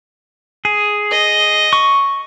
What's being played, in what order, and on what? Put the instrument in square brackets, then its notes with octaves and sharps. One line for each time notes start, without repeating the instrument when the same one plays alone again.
[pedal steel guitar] G#4
[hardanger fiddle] D#5
[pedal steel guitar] C#6